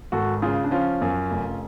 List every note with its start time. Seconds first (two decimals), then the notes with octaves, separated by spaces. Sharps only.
0.12 G#1 F#4 A4
0.42 C#3 F4 G#4
0.64 D4
0.71 F3 C#4 F4
1.01 F#2
1.31 F1